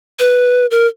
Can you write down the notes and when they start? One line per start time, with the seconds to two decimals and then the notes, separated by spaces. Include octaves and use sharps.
0.19 B4
0.71 A#4